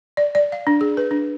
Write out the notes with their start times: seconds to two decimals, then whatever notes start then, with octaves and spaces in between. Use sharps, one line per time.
0.17 D5
0.35 D5
0.52 F5
0.67 D4
0.81 G#4
0.97 B4
1.11 D4